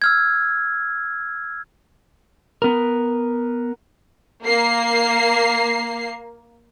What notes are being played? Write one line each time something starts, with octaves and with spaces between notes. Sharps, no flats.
E6 F6 G#6
B3 A#4
A#3 C7